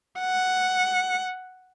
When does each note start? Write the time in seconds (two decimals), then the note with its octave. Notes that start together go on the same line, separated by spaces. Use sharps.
0.20 F#5